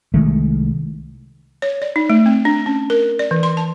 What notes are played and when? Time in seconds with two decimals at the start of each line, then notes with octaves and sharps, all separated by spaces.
0.14 C2 D#3 G#3 A3
1.62 C#5
1.82 D5
1.96 D#4
2.10 A3
2.26 C4
2.45 D4
2.66 C#4
2.90 A#4
3.19 D5
3.31 E3
3.43 C6
3.57 A5